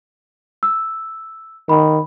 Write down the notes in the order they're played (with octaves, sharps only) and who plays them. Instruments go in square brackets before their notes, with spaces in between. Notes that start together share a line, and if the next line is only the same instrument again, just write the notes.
[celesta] E6
[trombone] D#3 [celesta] B5